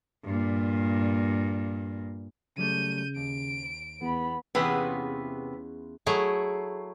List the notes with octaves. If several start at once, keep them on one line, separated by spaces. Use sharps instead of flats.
G2 A#2
C#3 F#3 G3 A3 G6 D#7
D#2 D7
E2 B3 B5
E2 C3 B3 C#4 F4 G#4 B4 F#5
F#3 A3 E4 G#4